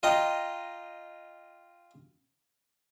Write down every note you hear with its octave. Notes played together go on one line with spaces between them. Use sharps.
F4 D#5 G5 A#5